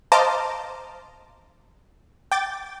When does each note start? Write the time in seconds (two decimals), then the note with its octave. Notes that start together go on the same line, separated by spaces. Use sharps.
0.12 C5 D#5 F5 A5 A#5 D6
2.31 G5 D6 A6